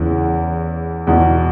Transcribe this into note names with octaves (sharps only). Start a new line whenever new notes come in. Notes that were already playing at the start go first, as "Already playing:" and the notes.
Already playing: E2 C#3 E3
E2 B2